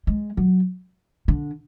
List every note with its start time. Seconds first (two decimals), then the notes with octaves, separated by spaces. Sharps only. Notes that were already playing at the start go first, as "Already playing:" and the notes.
0.07 G#3
0.37 F#3
1.28 D3